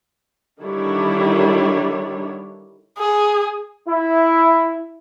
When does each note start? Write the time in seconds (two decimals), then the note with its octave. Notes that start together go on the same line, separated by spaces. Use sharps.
0.60 D3 D#3 G3 D4 E4 C#5
2.99 G#4
3.87 E4